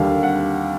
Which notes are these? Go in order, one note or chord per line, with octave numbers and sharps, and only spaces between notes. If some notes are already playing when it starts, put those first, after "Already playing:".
Already playing: D#2 D3 G3 F5
F#5